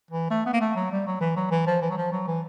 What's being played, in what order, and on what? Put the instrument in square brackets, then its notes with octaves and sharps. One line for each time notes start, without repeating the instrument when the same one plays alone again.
[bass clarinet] E3
A3
B3
A#3
A3
F#3
G3
F#3
E3
F#3
E3
F3
E3
F#3
F3
F#3
E3